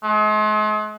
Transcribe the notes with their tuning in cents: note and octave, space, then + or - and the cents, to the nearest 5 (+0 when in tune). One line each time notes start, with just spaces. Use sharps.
G#3 +45